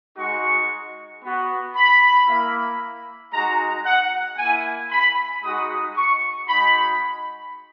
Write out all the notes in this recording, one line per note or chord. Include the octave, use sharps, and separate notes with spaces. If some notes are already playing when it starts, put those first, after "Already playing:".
G#3 D#4 F#4 C#6
B3 F#4
B5
A#3 E4
G#3 D#4 F#4 A#5
F#5
A#3 E4 G#5
B5
G#3 D#4 F#4 D#6
C#6
G#3 D#4 F#4 B5